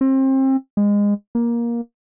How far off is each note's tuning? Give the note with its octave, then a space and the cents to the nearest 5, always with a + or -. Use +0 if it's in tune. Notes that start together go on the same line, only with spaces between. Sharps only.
C4 +30
G#3 -25
A#3 +15